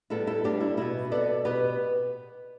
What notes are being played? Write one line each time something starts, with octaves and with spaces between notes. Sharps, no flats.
A2 G3 B3 E4 A4
E4 A4
A2 G3 B3 D4 G4
E4
B2 B3 E4
B2 B3 A4 D5
B2 B3 G4 B4